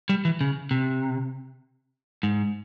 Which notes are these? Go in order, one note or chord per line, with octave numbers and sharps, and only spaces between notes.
G3
E3
C#3
C3
G#2